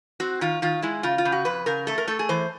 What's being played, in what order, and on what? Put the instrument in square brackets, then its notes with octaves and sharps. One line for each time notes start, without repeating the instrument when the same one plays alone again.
[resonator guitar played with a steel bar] C4 F#4
D#3 F4
D#3 F4
G#3 E4
C#3 F4
F4
C#3
F#4
F2 B4
C#3 A#4
A3 A4
A#4
A3 A4
G#4
E3 C5